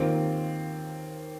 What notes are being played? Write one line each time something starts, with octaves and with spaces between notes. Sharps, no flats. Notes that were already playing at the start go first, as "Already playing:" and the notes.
Already playing: D#2 D#3 A#3 C4 F4 A#4